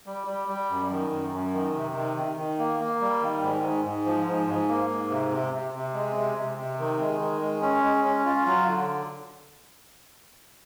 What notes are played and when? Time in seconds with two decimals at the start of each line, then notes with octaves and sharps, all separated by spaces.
0.06 G3
0.27 G3
0.48 G3
0.70 F#2
0.91 D#3
1.12 F#2
1.33 F#2
1.53 D#3
1.75 C3
1.95 D#3
2.17 D#3
2.37 D#3
2.59 A#3
2.80 A#3
3.01 G3
3.22 D#3
3.42 G#2
3.63 G#2
3.85 G#2
4.06 F3
4.26 G#2
4.47 G#2
4.69 A#3
4.89 G#2
5.10 C3
5.31 C3
5.53 C3
5.74 C3
5.94 G#3
6.16 C3
6.36 C3
6.57 C3
6.79 D#3
7.00 G#3
7.20 D#3
7.42 G#3
7.62 C#4
7.84 G#3
8.05 C#4
8.25 F4
8.46 F#3
8.68 D3